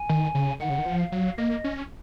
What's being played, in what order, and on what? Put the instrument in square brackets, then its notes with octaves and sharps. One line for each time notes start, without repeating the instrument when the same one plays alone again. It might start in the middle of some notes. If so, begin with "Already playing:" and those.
Already playing: [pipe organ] G#5
[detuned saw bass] D#3
C#3
[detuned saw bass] D#3 [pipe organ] F#5
[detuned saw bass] C#3
D#3
F3
[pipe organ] F5
[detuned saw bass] F#3
[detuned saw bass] A#3 [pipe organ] D#5
[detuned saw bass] C#4